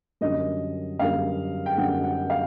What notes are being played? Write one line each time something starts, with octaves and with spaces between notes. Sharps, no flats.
F#2 D3 G3 A#3 D#5
F#2 D3 G3 A#3 F5
G5
F#2 D3 G3 A#3 F#5
F#5
F5